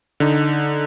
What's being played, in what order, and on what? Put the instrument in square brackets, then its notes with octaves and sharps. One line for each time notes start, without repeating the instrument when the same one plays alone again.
[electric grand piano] D3 D#4